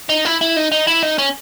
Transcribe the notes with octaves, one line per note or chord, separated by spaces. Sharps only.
D#4
E4
E4
D#4
D#4
E4
D#4
C#4